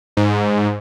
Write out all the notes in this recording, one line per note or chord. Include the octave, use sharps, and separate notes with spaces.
G#2